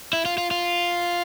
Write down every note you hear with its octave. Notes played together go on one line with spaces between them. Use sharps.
E4
F4
F4
F4